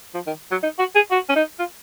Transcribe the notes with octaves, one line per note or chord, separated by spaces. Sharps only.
F3
D#3
F#3
D#4
F#4
G#4
F#4
C#4
D#4
F4